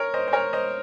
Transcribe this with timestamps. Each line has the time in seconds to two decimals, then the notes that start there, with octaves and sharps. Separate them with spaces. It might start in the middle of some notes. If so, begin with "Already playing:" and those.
Already playing: A#4 C#5
0.14 C5 D#5
0.28 C5
0.33 A#4 C#5
0.53 C5 D#5